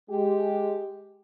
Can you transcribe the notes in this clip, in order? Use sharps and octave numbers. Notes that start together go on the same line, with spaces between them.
G#3 G4